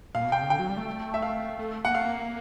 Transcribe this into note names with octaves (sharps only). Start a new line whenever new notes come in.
A#2 F5
B2
C3 G5
C#3
D3 G5
F#3
G3
A3
E5
F5
A3
A#3 F#5
A3 F5
A#3